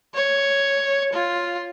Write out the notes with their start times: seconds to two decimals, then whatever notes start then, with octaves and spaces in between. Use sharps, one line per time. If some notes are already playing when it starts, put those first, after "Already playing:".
0.15 C#5
1.13 F4